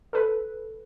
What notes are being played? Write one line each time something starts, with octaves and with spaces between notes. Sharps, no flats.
A4 B4